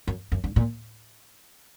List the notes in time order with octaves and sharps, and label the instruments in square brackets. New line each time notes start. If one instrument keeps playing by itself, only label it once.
[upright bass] F#2
F#2
G2
A#2